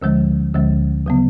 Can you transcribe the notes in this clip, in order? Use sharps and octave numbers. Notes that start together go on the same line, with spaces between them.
D2 D3 F3 G#3
D2 D3 F3 G#3
C#3 F#3 B3